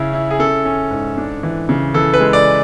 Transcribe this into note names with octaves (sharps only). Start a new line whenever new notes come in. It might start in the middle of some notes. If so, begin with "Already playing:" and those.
Already playing: C#3 C#4 E4
E4
G#4
C#4 A4
C#4
G#2
D4
E3
C#3
E3 A4
B4
G#3
D5